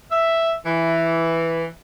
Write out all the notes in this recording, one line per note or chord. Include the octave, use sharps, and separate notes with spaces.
E5
E3